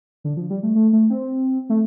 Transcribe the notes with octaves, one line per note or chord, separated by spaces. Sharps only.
D3
F3
G3
A3
A3
A3
C4
A3